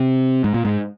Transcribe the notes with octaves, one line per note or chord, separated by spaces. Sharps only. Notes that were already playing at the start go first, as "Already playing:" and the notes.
Already playing: C3
G#2
A#2
G#2